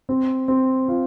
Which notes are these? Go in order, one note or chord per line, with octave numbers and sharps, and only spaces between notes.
C4
C4
F4